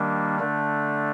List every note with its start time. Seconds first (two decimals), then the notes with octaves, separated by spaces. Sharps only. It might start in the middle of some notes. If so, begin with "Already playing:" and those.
Already playing: D#3 G3 A#3 D4
0.39 D3 A3 D4